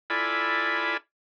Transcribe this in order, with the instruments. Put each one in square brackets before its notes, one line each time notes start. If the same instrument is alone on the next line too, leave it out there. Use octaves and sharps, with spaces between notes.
[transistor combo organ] E4 F4 A4 D5 G#5 B5